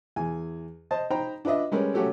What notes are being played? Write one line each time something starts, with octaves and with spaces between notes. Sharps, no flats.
E2 G#5
C5 D#5 A5
D#4 C5 G5 A#5 B5
D4 F4 B4 D#5 E5
G3 G#3 C#4 A#4 B4
F#3 A3 C#4 F#4 G4 A4